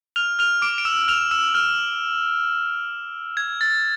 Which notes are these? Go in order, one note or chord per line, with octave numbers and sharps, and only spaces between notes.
F6 F7
F6 F7
D6 D7
D7
E6 E7
F6 F7
E6 E7
F6
G#6
A6